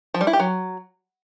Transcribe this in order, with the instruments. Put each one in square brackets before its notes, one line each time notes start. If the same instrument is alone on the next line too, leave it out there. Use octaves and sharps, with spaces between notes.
[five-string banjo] F3
G3
E4
G4
F#3